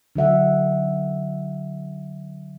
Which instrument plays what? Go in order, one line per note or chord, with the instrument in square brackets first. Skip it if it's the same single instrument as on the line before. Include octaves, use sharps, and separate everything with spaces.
[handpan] D3 F#3 E5 F#5